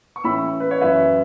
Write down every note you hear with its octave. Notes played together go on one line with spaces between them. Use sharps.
C#6
A2 E3 C#4 E4 B5 E6
B4
C#5
F#2 E3 C#4 B4 E5